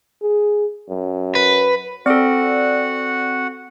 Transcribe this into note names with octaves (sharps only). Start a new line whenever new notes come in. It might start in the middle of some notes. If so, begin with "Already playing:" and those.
G#4
F#2
B4
C4 F#4 A4 D5 F#5